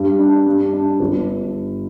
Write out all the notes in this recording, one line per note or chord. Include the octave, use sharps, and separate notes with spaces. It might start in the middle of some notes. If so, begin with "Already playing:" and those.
Already playing: G2
D4
G2
D4
G1